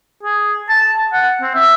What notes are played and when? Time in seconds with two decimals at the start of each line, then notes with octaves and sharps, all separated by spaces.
0.23 G#4
0.69 A5
1.13 F#5
1.42 C4
1.55 E5